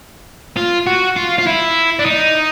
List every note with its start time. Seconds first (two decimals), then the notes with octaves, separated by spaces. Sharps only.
0.57 F4
0.87 F#4
1.16 F4
1.38 F4
1.47 E4
1.99 D4
2.06 D#4